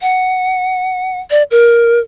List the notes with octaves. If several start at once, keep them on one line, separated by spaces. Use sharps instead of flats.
F#5
D5
A#4